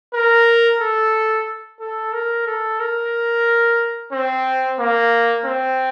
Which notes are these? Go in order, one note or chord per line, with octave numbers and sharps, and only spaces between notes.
A#4
A4
A4
A#4
A4
A#4
C4
A#3
C4